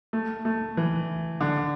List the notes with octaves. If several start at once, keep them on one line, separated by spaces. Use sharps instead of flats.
A3
A3
E3
D3